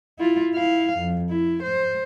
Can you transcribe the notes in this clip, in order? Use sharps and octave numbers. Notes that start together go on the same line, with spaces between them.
E4 F4
E4 F5
F2
E4
C5